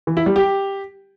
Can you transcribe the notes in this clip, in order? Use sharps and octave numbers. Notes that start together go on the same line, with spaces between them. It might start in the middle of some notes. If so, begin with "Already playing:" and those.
E3
E4
G3
G4